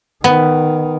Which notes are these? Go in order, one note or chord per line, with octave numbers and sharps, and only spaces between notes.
D#3 B3